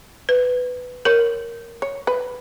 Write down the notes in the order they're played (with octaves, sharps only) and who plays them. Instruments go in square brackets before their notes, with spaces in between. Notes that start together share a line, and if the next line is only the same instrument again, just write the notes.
[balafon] B4
[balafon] A#4 [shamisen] C#5
[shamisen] C#5
B4